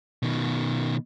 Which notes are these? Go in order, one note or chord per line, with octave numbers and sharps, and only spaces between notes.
B2 D#3